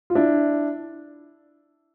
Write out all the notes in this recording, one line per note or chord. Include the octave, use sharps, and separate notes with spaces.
F4
D4 E4